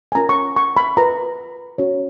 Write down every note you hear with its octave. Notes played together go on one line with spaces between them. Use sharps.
G#5
C#4 F4 A#4 A#5
C#6
C#6
B5
F4 B4 A#5
C#4 F#4 C#5